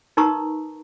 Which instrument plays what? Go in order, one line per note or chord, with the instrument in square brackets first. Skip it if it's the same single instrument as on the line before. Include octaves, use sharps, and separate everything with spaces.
[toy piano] D#4 A#4 B4 A#5 C#6 D#6